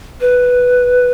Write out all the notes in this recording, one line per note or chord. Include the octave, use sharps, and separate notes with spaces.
B4